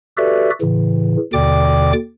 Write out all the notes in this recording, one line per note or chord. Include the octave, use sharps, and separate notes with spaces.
F#4 G4 A4 B4 D5 E5
A2 C#3 E3
D#2 B2 D3 D5 G5 D6